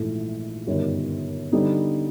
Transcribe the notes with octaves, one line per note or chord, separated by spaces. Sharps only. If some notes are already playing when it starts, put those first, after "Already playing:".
Already playing: A#1 G#2 E3 A3
G1 F#2 D#3 G3
D3 G3 B3 D#4